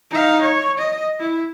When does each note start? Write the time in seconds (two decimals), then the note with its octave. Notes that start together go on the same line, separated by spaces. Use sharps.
0.11 D#4 F5
0.42 C#5
0.78 D#5
1.19 E4